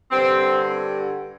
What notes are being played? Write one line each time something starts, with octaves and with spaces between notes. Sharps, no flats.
G2 D3 G3 C4